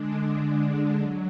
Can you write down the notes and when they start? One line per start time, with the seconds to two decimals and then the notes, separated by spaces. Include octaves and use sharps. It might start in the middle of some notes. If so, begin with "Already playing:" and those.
Already playing: D3 G#3 D4
0.99 F#3